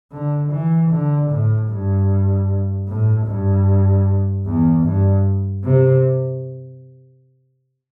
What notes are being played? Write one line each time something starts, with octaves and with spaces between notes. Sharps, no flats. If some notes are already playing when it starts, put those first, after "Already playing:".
D3
E3
D3
A2
G2
A2
G2
E2
G2
C3